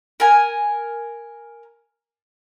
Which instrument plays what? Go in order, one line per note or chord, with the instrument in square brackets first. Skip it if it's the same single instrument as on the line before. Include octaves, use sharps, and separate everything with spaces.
[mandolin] A#4 G#5